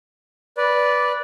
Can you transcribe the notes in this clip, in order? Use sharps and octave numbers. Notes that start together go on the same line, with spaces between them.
B4 D5